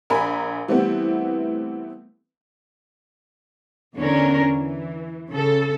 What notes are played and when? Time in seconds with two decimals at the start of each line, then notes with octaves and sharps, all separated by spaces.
0.10 A#1 A#4 G#5 B5
0.68 E3 G3 A3 B3 C4 E4
3.96 E2 D3 C#4 D4 A#4
4.51 E3
5.30 C#3 A4